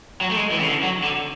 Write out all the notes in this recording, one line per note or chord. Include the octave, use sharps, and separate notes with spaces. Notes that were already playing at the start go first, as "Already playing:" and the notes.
F#3
A3
G#3
E3
C#3
D3
F#3
D3